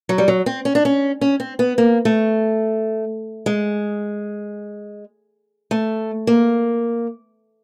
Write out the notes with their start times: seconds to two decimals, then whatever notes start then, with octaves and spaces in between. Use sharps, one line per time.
0.09 F#3
0.18 G3
0.28 F#3
0.46 C4
0.65 C#4
0.75 D4
0.85 C#4
1.21 C#4
1.40 C4
1.59 B3
1.78 A#3
2.05 A3
3.46 G#3
5.71 A3
6.27 A#3